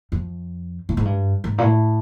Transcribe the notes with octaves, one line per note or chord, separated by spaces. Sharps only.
F2
A2
G#2
G2
G#2
A#2
A2